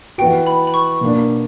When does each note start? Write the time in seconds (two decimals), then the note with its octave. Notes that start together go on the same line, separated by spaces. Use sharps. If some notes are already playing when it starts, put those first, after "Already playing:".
0.18 E3 B3 F#4 G5
0.47 B5
0.67 B5
0.74 C#6
1.01 B2 A#3 D4